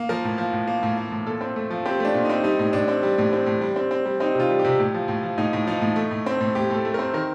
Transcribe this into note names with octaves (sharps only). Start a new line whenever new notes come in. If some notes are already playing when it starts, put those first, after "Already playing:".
Already playing: A#3
F3 A#4
A2
F3
A2
A#3
A2
A#3
A2
A#2 A4
C4
A3
F3
C4 G4
A3 D4
A#2
C4 D#4
G3 D#4
A2
A2 D4
C4
G3
A2
C4
A2
G3
C4
C4
G3
C4 D#4
C3 F4
G3
G4
C3
A2
F3
A2
F3
A2 D#4
A2
F3 D#4
A2
A3
A2
C4
A2
A2 G4
A2 A4
A3
C4 A#4
D#3 A#4